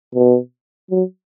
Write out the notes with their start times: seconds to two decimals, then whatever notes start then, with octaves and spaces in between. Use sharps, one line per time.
0.15 B2
0.91 F#3